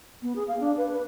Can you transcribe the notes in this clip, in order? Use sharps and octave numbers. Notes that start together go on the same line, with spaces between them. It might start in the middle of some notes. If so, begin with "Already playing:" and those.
B3
G#4
F5
D4
B4
B4